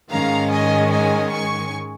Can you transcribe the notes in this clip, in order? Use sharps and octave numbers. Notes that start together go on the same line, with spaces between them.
G#2 D#3 G#3 C#4 F5 A#5
D#5 G#5
D#5 G#5
G#5 C#6